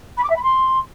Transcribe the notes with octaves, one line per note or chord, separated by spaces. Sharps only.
B5
D6
E5
B5
C6